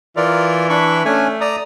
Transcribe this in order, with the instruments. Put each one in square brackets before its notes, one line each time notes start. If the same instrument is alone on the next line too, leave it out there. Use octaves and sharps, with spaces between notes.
[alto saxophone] E3 [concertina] F4 A#4 D5
[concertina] D4 B5 C#6
[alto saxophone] A3 [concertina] C#4 D4 G#5
[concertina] D5 A#5 D#6